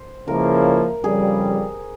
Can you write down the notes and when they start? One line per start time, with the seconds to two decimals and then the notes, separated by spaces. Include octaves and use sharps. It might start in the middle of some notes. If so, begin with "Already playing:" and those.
Already playing: C5
0.27 C#2 C#3 F3 A#3 E4 A#4
1.04 F2 C#3 G3 G#4